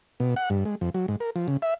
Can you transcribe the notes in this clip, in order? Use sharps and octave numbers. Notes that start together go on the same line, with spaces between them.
B2
F#5
G2
G#3
F2
F#3
G#2
A#4
F3
C#3
E5